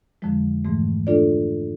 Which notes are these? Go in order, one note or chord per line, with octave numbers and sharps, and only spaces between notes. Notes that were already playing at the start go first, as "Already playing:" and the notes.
F2 D3 F3 G#3
G#2 E3 A3
A3 D4 F4 A4 D5